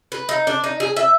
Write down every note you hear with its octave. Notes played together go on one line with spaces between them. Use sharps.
B4
D#4
D4
D#4
G#4
E5